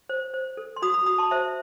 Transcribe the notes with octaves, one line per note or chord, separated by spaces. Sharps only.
C5
C5
A4
C6
F#4 B5 D#6
B5 D#6
F#4 B5 D#6
A5 C6
C5 E5